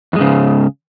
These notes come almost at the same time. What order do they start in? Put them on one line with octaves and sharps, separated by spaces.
E2 G#3 G#2 C#3